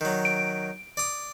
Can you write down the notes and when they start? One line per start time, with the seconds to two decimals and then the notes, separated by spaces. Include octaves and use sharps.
0.01 D#3 F#3
0.25 D7
0.97 D5 D#6